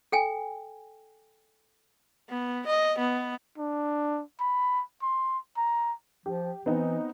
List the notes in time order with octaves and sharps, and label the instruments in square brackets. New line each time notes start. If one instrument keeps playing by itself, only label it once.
[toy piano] A4 G5 G#5
[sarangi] B3
D#5
B3
[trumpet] D4
B5
C6
A#5
[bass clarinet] F3 [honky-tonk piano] G4
[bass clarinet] E3 [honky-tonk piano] B3 C4 D#4